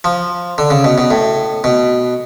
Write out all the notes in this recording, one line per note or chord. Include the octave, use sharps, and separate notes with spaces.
F3
D3
C#3
B2
B2
A2
B2